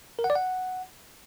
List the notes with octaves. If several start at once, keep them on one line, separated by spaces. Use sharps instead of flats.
A#4
F#5
D5
F#5